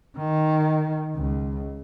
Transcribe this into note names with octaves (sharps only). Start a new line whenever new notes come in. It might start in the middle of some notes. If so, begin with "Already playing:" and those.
D#3
C#2